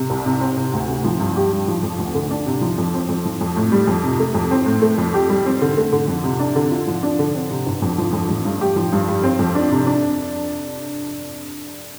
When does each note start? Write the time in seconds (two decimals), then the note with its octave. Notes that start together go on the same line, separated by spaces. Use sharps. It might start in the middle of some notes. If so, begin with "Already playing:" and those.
Already playing: C3
0.10 C2
0.26 C3
0.41 C4
0.56 C3
0.73 D2
0.88 C3
1.04 F3
1.19 G2
1.36 G4
1.51 G3
1.68 F3
1.83 F2
1.98 D2
2.14 D3
2.31 D4
2.46 C3
2.61 F3
2.78 F2
2.94 C4
3.09 F2
3.25 F3
3.41 F2
3.56 A2
3.72 G3
3.87 F2
4.04 C3
4.20 A3
4.35 F2
4.51 C4
4.66 A2
4.82 A3
4.98 F2
5.14 G4
5.29 G3
5.46 C4
5.61 D3
5.77 A3
5.92 D3
6.08 F2
6.24 C3
6.39 D4
6.55 D3
6.71 F4
6.87 F3
7.03 D4
7.19 D3
7.35 C4
7.51 C3
7.66 G1
7.82 F2
7.98 F3
8.13 F2
8.29 A1
8.45 G2
8.61 G4
8.76 F3
8.92 G2
9.08 G3
9.23 C4
9.39 F2
9.55 D4
9.71 C3
9.86 D4